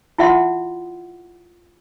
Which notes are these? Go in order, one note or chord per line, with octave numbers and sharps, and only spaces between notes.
E4 F4 E5 F#5 C6